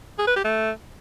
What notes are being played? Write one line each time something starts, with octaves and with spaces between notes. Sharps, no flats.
G#4
B4
G4
A3